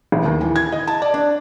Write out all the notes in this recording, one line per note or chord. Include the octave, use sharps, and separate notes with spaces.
A1
D#2
E3
G#6
D#5
A5
D5
D4